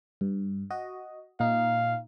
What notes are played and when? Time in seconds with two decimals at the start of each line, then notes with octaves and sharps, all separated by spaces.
0.21 G2
0.70 F#4 D#5
1.40 A#2 D#4 F5